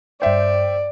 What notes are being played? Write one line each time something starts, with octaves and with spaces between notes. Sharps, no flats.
G2 C5 D5 E5 G5